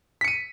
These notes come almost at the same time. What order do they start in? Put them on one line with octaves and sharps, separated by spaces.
B6 C#7 D#7